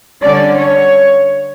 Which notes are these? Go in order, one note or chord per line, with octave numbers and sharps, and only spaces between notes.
D3 G3 C#4 D5
C#5